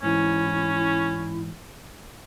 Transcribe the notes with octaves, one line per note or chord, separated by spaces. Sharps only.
G#2 E3 C#4 E4